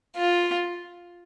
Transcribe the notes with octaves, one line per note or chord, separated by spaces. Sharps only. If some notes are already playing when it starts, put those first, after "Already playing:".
F4